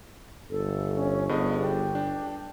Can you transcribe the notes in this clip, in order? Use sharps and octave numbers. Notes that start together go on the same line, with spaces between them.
G1 A4
C#4
G2 B3 G#4 D#5
D4 G4
D4